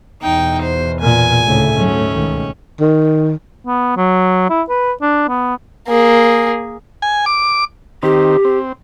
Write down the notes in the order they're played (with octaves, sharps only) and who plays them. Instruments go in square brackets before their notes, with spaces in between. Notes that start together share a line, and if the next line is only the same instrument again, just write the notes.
[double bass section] E2 B2 [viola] D#4 G5
[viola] C5
[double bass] A#2 [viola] G#5
[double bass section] D2 A2 C#3 [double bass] A3
[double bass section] G#2 F#3 [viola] C#4
[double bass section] C#2 B2 D#3
[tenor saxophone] D#3
[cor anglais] B3
F#3
E4
B4
D4
B3
[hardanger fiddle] A#3 G#4
[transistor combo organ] G#5
D6
[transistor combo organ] D#3 C4 [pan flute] G4
[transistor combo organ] C4